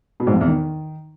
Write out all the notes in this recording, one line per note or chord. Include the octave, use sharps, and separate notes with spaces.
B2
G#2
F2
E2
D#3